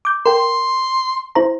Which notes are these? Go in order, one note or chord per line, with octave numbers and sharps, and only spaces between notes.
D6 G6
A#4 G5 C6
E4 C5 A#5